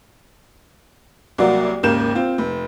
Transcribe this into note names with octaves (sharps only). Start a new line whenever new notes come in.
C2 F#3 A#3 F#4 D5
G#1 D#2 C#3 A#3 G6 E7
C4 F4
F1